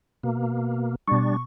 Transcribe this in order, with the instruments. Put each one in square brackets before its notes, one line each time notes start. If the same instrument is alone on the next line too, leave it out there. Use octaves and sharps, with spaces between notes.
[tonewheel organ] B2 A#3
[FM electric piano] B2 C#6 [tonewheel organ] G3 D4